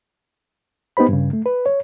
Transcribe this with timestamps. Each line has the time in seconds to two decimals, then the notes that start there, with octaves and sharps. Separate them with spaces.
0.97 B3 D#4 G4 C5 B5
1.09 G2 C#3
1.33 A3
1.46 B4
1.66 C#5